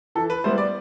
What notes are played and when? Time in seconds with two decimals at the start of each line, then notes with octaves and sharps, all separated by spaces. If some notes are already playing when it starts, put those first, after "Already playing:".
0.15 E3 A4
0.30 B4
0.44 G3 B3 E4 C5
0.58 D5